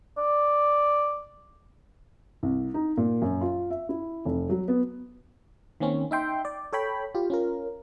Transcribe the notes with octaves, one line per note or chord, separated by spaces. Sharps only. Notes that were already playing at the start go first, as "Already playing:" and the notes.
D5
C2
D#4
A#2
F#2
F4
E5
E4
F1
F#3
B3
D#3 A#3 C4 C#4
D#4 E5 G5 C6
D5
A4 C#5 G5 B5
F4 G4
C#4 F4 A#4